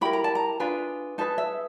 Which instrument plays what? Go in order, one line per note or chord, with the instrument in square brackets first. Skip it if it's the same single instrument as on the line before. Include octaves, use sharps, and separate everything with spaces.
[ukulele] E4 G4 A#4 B5
A#5
A5
A#5
D4 F4 G#4 B4
D#4 G#4 B4 A5
E5